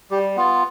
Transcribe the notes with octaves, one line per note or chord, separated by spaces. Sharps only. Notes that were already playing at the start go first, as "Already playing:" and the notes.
G3 G4
B3 F4